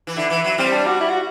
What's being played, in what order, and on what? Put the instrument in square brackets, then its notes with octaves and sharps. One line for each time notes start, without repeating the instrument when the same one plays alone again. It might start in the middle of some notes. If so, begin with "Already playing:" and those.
[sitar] E3
[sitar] D3 [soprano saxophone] E4
[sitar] E3
F#3
[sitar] G3 [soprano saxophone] C4
[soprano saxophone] D4
F#4
E4
F#4